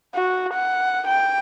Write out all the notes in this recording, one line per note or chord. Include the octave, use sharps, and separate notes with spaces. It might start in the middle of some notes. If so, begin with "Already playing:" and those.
F#4
F#5
G5